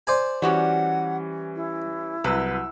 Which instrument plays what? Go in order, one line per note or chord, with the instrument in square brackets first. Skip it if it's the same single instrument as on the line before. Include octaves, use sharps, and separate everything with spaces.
[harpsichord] C5 D5 G#5
[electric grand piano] E3 C#4 [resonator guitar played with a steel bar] G3 F#4 G4 [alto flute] F#5
[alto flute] E4
[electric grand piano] C2 B4 E6 [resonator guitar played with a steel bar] F#3